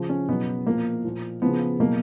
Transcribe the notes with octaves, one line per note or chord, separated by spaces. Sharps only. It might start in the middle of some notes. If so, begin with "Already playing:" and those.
Already playing: C#3 F3
C#4
B2 F#3 B3
A#2 F3 A#3
A#2 F3
C#3 F3 B3
B2 F#3 A#3